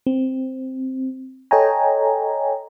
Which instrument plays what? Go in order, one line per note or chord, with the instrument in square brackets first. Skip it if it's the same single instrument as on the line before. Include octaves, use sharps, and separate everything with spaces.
[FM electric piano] C4
A4 C#5 D#5 G5 G#5 A#5